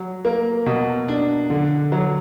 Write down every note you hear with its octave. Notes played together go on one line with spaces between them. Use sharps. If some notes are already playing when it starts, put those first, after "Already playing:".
Already playing: F#3
A#3
B2
D4
D3
F#3